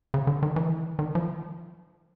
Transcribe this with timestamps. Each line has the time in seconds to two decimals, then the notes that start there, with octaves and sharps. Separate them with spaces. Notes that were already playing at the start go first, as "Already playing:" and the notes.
0.14 C#3
0.27 D3
0.43 D#3
0.56 E3
0.99 D#3
1.15 F3